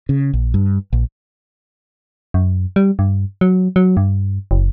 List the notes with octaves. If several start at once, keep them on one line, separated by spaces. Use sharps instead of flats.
C#3
A#1
G2
A#1
F#2
G3
G2
F#3
F#3
G2
F#1